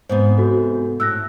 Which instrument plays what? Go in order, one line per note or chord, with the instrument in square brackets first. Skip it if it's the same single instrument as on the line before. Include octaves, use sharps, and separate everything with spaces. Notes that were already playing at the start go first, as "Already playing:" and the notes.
[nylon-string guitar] G#2 C3 B3 [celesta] C5
[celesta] F#4 A4
[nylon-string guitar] A2 [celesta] E6 F#6 A#6